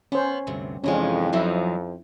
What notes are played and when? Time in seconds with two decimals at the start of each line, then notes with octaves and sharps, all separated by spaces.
0.12 B3 C#4 C5
0.47 D2 G2 C3
0.84 F2 C3 E3 G#3 C#4 D4 F4
1.33 F3 F#3 D#4 E4 E5